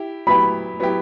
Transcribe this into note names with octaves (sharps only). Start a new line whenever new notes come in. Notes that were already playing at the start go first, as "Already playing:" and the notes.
Already playing: E4 G4
F#3 B3 E4 G4 B5
F#3 B3 E4 G4